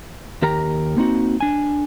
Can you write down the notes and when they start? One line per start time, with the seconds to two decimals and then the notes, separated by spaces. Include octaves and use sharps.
0.42 D#2 G4 A#4 G5 A#5
0.97 A#3 C4 D#4 F#4
1.40 D4 G#5